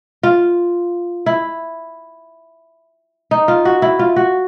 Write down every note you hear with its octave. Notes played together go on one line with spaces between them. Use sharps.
F4
E4
D#4
F4
F#4
E4
F4
F#4